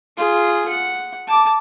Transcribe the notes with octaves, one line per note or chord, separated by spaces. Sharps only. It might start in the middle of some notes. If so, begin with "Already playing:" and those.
F4 G#4
F#5
A5 D6